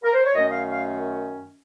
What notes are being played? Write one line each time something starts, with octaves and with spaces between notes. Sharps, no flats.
A#4
C5
C#5
F#2 D#3 A3 C#4 D#5
F5
F5